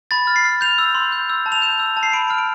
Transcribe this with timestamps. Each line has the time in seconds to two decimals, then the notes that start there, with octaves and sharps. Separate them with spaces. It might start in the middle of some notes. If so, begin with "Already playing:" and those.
0.11 B5 A6
0.27 F6
0.36 C7
0.45 F6
0.61 G6 F7
0.78 E6
0.95 C6
1.12 G6
1.30 E6
1.46 A5
1.52 F7
1.62 G6 E7
1.80 E6
1.97 A5
2.03 C7
2.13 B5 D7
2.30 F6
2.38 D7